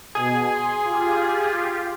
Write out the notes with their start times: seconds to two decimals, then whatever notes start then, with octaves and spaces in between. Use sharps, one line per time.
0.15 B2 G#4
0.52 C6
0.84 F4 G4